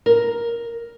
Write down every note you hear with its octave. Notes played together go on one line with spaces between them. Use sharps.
A#4